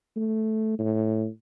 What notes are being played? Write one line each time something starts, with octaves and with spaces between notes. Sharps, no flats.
A3
A2